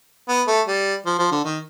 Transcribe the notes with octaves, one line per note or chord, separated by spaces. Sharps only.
B3
A3
G3
F3
F3
D3
D#3